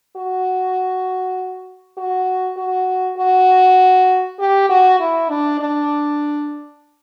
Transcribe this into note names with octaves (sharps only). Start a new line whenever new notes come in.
F#4
F#4
F#4
F#4
G4
F#4
E4
D4
D4